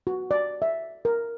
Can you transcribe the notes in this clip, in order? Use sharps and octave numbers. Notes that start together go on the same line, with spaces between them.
F#4
D5
E5
A#4